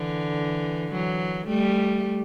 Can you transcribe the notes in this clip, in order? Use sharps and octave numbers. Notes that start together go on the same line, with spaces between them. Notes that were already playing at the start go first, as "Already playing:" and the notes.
Already playing: D3 E3
E3 F#3
G3 A3